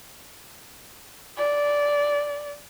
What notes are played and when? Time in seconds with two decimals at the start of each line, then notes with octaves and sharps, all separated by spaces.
1.38 D5